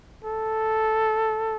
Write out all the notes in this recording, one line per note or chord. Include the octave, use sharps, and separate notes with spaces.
A4